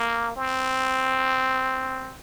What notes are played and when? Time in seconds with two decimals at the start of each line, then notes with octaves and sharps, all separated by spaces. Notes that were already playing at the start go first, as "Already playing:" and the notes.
Already playing: A#3
0.36 C4